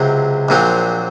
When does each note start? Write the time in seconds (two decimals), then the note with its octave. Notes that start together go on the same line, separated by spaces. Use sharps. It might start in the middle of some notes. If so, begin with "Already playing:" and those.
Already playing: C#2 C3 F#3 C4 G#4
0.49 A#1 A#2 F#3 C4